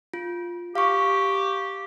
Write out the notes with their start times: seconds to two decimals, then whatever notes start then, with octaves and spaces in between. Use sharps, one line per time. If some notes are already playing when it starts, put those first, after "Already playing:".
0.14 F4
0.75 G4 F5 C#6